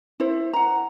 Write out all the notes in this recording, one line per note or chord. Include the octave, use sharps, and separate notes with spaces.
E4 C5
F#5 A#5